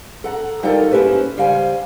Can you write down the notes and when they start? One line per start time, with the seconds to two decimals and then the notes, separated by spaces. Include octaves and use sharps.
0.24 A4 F#5 A#5
0.63 G3 D#4 F4 F#4 A4 A#4
0.91 A#3 C#4 E4 G4 B4 C5
1.37 C#3 G3 C5 F5 G#5